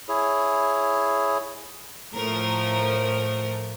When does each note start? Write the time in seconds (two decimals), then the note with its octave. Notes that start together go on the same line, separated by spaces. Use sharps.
0.08 E4 G#4 C#5
2.14 A2 F3 A3 A#4